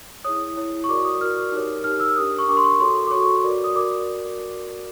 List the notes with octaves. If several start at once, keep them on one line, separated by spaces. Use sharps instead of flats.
E4 G#4 C#5 D#6
E4 G#4 C#5
C#6
F#4 A#4 D5 D6
D#6
F#4 A#4 D5 F6
D#4 G4 A#4 C#5
D#4 G4 A#4 C#5 F6
E6
D4 G4 A#4 D#6
C#6
D4 G4 A#4 D6
C6
C#6
F#4 A4 C#5 C6
D6
F#4 A4 C#5 C#6
F#4 A#4 D5
D#6
F#4 A#4 D5 D6